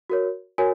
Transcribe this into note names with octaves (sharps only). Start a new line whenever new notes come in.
F#4 A#4 C#5
F#4 A#4 C#5 G#5